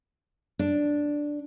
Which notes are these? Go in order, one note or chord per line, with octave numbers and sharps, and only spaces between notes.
D4